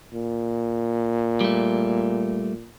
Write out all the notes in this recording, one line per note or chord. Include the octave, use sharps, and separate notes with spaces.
A#2
G3 A3